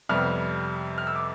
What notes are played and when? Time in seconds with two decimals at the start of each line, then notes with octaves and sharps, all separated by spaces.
0.09 F2 C3 G3 B3 F6
0.98 F6
1.07 E6
1.16 D6